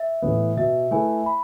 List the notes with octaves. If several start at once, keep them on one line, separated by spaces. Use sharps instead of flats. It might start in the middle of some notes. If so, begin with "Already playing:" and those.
Already playing: E5
A2 E3 B3
B2 E5
A3 E4 B4 G#5
B5